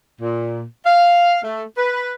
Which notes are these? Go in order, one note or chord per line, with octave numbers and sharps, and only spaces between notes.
A#2
F5
A3
B4